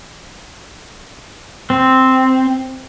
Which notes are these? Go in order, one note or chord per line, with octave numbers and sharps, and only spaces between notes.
C4